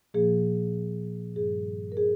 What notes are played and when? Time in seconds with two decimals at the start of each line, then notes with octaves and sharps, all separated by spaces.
0.14 A#2 F3 A#3 G#4
1.36 G2 D#3 G3 G#4
1.92 A#4
1.97 G#4